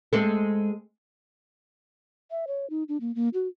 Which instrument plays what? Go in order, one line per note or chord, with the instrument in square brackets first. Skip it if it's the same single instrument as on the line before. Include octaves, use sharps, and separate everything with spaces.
[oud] G#3 C4 A4
[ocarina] E5
C#5
D#4
D4
A#3
A#3
F#4